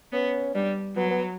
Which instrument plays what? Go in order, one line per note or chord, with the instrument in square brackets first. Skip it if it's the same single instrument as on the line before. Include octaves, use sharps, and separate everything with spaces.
[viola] B3 [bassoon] C#4
[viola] G3 [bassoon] D4
[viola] F#3 [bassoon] B3
[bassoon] B3